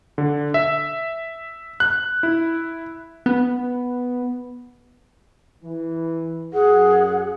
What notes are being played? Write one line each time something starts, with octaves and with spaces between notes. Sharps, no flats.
D3
E5
F#6
E4
B3
E3
F#2 G#4 F#5